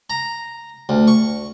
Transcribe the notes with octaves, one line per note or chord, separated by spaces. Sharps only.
A#5
D2
C#6